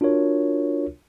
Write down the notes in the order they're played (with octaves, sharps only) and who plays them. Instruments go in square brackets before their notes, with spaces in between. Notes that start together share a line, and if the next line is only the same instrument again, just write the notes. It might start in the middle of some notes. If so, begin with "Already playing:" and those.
[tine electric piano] D4 F4 F#4 A#4 C#5